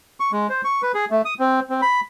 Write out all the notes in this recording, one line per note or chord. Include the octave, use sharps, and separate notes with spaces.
C#6
G#3
C5
C#6
B4
G#4
A3
D#6
C4
C4
B5